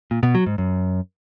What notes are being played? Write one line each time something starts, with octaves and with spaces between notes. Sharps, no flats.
A#2
B2
F#3
G#2
F#2